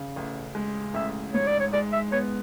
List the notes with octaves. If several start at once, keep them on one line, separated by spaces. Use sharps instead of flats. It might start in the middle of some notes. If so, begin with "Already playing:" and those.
Already playing: C#3
A1
G#3
A1 E5
G#2 C#5
D5
C#5
G#3 D5
E5
B3 C#5